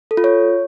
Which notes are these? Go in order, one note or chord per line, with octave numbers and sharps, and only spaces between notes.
A4
F4
C#5